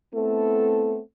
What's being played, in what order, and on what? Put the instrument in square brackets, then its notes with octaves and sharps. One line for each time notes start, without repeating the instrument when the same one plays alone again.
[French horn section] A3 B3 C4 E4 A4